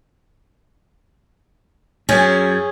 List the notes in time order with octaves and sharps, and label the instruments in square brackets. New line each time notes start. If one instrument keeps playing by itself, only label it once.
[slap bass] F#2 [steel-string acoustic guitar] C#4 G#4